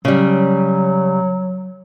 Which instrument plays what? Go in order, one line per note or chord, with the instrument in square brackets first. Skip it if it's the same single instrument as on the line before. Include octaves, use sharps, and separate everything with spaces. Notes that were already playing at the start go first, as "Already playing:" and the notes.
[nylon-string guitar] C#3 G3 [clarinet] F#3